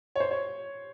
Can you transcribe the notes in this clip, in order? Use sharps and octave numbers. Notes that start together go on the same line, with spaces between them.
C#5
C5
C#5